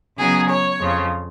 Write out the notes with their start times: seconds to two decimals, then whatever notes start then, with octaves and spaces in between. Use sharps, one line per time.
0.18 C#3 F#3 B3 D#4 G#4
0.49 C#5
0.80 F2 C#3 F3